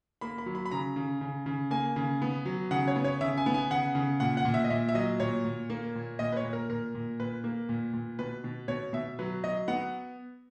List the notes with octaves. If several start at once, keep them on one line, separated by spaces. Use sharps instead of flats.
A#3 B5
B5
F#3
B5
B5
C#3 A#5
C#3
C#3
C#3
A#3 G#5
C#3
B3
F#3
C#3 F#5
C#5
B3
C#5
C#3 E5
G#5
B3
G#5
C#3 F#5
C#3
A#2 F#5
F#5
A#2
E5
D#5
A#2 E5
E5
F#3 D#5
A#2 C#5
A#2
A#3
A#2
A#2 D#5
B4
C#5
A#2
A#4
A#2 A#4
A#2
A#2 B4
A#3
A#2
A#2
B2 B4
B2
B2 C#5
B2 E5
F#3 B4
F#3 D#5
B3 F#5